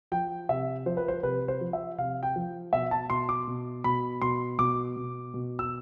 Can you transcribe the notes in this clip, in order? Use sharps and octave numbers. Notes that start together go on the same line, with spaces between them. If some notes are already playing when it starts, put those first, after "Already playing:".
F3 G5
C3 E5
F3 C5
B4
C5
C3 B4
C5
F3
E5
C3 F5
G5
F3
B2 E5
A5
B2 C6
D6
B2
B2 B5
B2 C6
B2 D6
B2
B2
E6